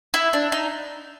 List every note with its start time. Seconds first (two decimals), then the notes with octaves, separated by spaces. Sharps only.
0.14 E4
0.33 D4
0.52 D#4